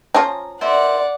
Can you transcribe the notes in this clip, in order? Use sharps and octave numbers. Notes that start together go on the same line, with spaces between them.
F3 C#4 F4 A#5
A#4 C5 D5 E5 F#5